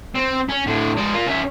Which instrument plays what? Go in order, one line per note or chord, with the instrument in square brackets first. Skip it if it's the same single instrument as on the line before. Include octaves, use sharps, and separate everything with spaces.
[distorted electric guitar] C4
C#4
A2 D3
G#3 D5
F4 A#4
C#4 E5